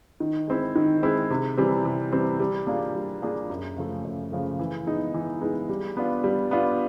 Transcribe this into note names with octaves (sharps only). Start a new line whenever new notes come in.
D#3
G#3 C4 E4
D#3
G#3 C4 E4
C3
E3 G3 C4
C3
E3 G3 C4
G3
A#3 D4 F4 G#4
G3
A#3 D4 F4 G#4
F#2
C#3 F3 A3
F#2
C#3 F3 A3
E3
G#3 B3 D#4
E3
G#3 B3 D#4
G3
B3 D4 F4
G3
B3 D4 F4